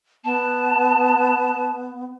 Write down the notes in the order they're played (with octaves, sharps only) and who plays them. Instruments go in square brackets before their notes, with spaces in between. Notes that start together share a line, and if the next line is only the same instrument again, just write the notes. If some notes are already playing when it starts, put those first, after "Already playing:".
[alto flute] B3 [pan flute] A5